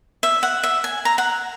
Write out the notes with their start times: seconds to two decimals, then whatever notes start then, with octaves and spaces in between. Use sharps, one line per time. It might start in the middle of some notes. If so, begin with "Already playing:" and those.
0.23 E5
0.43 F#5
0.63 E5
0.84 G#5
1.05 A#5
1.18 F#5